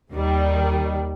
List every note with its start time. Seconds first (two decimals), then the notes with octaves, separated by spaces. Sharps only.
0.11 D#2 D#3 G3